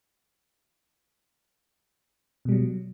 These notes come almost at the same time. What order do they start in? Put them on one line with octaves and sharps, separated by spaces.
B2 G3 F#3